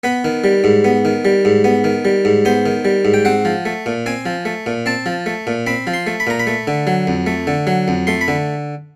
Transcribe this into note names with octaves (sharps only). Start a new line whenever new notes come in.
B3 B4
D#3
G3
G#2
B3
D#3
G3
G#2
B3
D#3
G3
G#2
B3 C5
D#3
G3
G#2
G5
C4 F#5
F3
A3
A#2
C4 G#5
F3
A3
A#2
C4 A5
F3
A3
A#2
C4 B5
F3
C6
A3
B5
A#2 A#5
B5
A3
D3
F#3
F2
A3
D3
F#3
F2
A3 C6
B5
D3